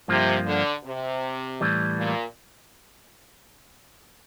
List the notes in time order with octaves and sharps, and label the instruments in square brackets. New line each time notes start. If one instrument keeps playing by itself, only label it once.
[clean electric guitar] G2 F3 A#3 F4 [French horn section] C3
[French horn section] D3
C3
[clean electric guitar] A2 E3 G3
[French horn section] A#2